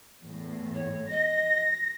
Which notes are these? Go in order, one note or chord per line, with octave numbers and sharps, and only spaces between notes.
E2 A2
C#5
D#5 A#6